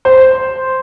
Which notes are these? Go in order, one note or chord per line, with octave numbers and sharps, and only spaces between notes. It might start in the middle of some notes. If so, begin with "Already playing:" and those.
C5